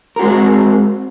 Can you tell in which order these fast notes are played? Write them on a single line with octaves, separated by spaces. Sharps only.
A#4 F#4 G#3 C4